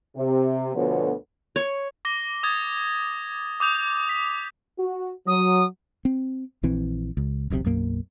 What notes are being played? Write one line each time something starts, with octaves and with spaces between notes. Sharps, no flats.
C3
D2 B2 D3 F3 B3 C#5
C#5
D6 A#6 G7
D#6 G#6 A6
D6 D#6 G6 F7
B6
F#4
F#3 D#6
C4
A#1 E3 C4
C#2
E1 B1 A2 C3
B1 F#2 A#3